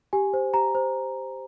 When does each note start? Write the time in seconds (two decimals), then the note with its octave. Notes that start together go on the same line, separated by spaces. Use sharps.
0.13 G4 G#5
0.34 C5
0.54 G4 A#5
0.75 C5